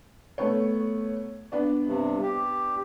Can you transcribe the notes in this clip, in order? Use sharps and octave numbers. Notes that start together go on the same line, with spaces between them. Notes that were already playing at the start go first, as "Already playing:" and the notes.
A3 B3 C#5
B3 D4
G2 C3
G4